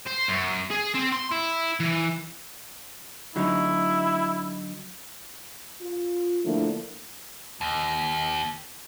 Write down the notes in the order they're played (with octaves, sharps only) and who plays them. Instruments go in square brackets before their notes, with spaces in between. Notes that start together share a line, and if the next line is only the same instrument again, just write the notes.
[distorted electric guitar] C5
F#2
G#4
C4
C6
E4
E3
[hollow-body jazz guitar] D3 F#3 D#4 [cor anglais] E4
[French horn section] F4
D3 F3 A3 A#3 D4 E4
[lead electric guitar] D#2